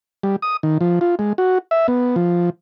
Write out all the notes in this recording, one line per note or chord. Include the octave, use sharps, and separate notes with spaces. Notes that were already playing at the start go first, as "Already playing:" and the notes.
G3
D#6
D#3
F3
F4
G#3
F#4
E5
B3
F3